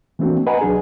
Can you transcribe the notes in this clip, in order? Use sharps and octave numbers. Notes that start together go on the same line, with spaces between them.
E3 A3 A#3 C4 D4 F#4
B4 D#5 F#5 G#5 A#5
C2 F#3 D4 G#4